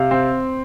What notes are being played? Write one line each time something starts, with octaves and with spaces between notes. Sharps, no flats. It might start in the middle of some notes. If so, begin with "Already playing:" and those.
Already playing: C3 F5
C4